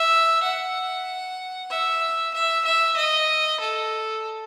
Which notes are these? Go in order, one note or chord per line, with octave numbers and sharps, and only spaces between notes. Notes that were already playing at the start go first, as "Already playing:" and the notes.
Already playing: E5
F#5
E5
E5
E5
D#5
A4